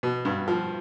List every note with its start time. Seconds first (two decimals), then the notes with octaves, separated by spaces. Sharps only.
0.03 B2
0.25 G2
0.48 F3